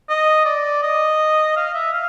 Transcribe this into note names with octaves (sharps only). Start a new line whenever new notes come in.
D#5
D5
D#5
F5
E5
F5